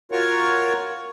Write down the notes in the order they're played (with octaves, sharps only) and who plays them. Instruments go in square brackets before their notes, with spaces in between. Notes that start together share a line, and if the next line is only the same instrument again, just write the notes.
[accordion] F4 F#4 A#4 C#5 C#6